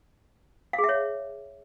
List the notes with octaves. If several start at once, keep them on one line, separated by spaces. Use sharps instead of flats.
F5
G#4
E5
C#5